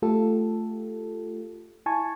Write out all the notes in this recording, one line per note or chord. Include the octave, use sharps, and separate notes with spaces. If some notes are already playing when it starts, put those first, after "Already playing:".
A3 F4 G4 A4
E4 G#5 A5 C#6